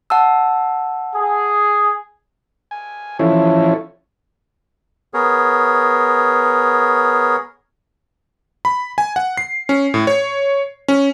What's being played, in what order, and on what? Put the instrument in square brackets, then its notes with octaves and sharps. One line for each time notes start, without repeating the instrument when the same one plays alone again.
[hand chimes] F#5 A5 E6
[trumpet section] G#4
[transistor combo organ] G#5
E3 F3 C#4 E4 A4 C#5
[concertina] B3 G#4 A#4 C#5
[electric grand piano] B5
G#5
F#5
C7
C#4
A2
C#5
C#4